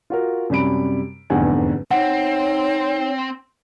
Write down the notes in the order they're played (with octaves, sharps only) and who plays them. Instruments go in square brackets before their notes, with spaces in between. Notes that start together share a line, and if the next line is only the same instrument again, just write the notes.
[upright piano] F4 F#4 A#4
F#2 C3 G3 B5 D7
F1 E2 G#2 D3 F#5 G#5
[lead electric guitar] C4 [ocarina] D#4 [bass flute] C#5 [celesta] F#5